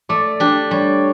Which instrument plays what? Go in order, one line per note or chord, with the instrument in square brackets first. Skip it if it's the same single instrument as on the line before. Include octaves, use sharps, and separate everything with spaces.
[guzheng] A3 [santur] D5
[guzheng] D4 G4
[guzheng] G3 [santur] C#5